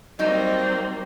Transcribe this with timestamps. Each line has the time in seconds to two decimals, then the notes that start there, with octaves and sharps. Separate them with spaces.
0.19 F#3 G3 A#3 C4 D#4